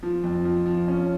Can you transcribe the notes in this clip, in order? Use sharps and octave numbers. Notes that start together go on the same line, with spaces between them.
F3
F2
F3
F3
C#4